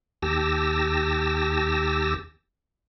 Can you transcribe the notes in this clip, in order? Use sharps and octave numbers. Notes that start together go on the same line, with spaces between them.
D#2 G4 A5 E6 A#6